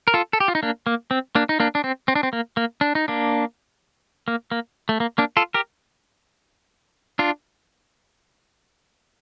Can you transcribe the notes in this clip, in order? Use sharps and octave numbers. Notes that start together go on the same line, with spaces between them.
A#4
F4 A4
A4
G4
F4
D#4
A#3 D4
A#3
C4
A#3 D4
D#4
A#3 D4
D4
C4
C4
D4
C4
A#3
A#3
D4
D#4
A#3 D4
A#3
A#3
A3
A#3
A#3 D4
F4 A4
G4 A#4
D4 F4